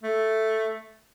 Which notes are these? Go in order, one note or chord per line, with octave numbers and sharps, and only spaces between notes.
A3